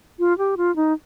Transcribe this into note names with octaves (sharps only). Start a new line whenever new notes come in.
F4
G4
F4
D#4